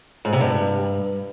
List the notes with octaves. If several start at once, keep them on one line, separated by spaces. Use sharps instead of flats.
G#2
C3
G2